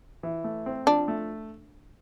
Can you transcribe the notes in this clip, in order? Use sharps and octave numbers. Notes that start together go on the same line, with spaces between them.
E3
A3
C4
F3 D4
A3